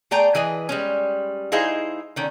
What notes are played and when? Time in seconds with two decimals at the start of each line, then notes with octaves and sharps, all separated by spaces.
0.11 A3 G#4 D5 G5 A#5
0.35 E3 G#4 B4 D#5
0.69 G3 G#3 C#4
1.52 D#4 E4 G#4 C5 D#5 F5
2.16 D3 D#3 C#4